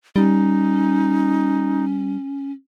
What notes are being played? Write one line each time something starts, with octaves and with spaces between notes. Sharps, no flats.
G3 C#4 D#4